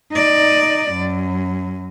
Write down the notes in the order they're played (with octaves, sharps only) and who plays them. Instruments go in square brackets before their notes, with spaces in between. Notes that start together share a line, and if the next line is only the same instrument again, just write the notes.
[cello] D#4 D5
F#2